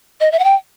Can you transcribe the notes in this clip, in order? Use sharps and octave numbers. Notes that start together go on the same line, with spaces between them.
D#5
E5
F#5
G5